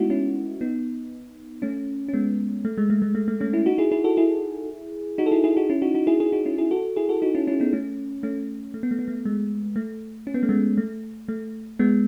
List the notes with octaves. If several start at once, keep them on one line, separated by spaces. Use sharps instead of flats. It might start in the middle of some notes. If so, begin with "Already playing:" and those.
Already playing: G#3 A3 B3 D#4 E4 F#4
C#4 E4
B3 D#4
A3 C#4
C#4
G#3 B3
A3
G#3
A3
G#3
A3
A3
A3 C#4
C#4 E4
D#4 F#4
E4 G#4
E4 G#4
F#4 A4
E4 G#4
D#4 F#4
A4
E4 G#4
E4 G#4
D#4 F#4
C#4 E4
D#4 F#4
D#4 F#4
E4 G#4
E4 G#4
D#4 F#4
C#4 E4
E4 G#4
F#4 A4
E4 G#4
F#4 A4
D#4 F#4
C#4 E4
C#4 E4
B3 D#4
A3 C#4
A3 C#4
A3
B3
A3
B3
A3
G#3
A3
C#4
B3
A3
G#3 B3
A3
A3
G#3 B3